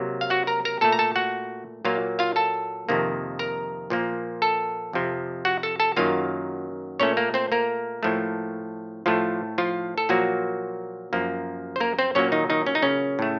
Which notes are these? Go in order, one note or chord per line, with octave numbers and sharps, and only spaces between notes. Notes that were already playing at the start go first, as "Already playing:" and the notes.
Already playing: C3 F#3 A#3
F5
F#4 F#5
A#4 A#5
A#4 A#5
A#2 A3 A4 A5
A#5
A4 A5
F#4 F#5
A#2 F#3 A#3 F4 F5
F4 F5
A4 A5
F2 C3 D#3 A#3
A#4 A#5
A#2 F3 A#3
A4 A5
F2 C3 F3
F#4 F#5
A4 A5
A4 A5
F#2 D#3 F#3 A#3 F4 F5
A#2 A3 C#4 C#5
A#3 A#4
C4 C5
A#3 A#4
A2 F3 A3
A2 F3 A3 F4
F3 F4
A4
A#2 F3 F#3 A#3 F#4
F#2 F3 A#3
C5
A#3 A#4
C4 C5
A#2 F#3 A#3 C#4 C#5
D#3 D#4
D#3 D#4
C#4
D#4
C#3 C#4
A2 A3